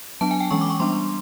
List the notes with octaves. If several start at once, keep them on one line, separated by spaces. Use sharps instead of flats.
F#3 B3 D4 A5
G#5
G5
E3 G#3 C#4 C#6
D6
C#6
G3 B3 D4 C6